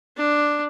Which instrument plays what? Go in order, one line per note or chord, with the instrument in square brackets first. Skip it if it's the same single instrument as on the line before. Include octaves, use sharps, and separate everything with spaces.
[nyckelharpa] D4